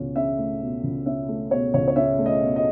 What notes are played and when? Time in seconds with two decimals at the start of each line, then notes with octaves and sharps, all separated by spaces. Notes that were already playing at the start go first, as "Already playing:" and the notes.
Already playing: C#2 B2 C#4
0.16 C#4 E5
0.38 A3
0.61 B2
0.84 C#2
1.06 C#4 E5
1.28 A3
1.51 B2 C#5
1.74 C#2 C#5
1.88 C#5
1.96 C#4 E5
2.19 A3
2.26 D#5
2.41 B2
2.56 D#5